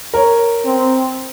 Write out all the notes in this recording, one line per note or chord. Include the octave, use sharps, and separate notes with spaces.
A#4 C#5
C4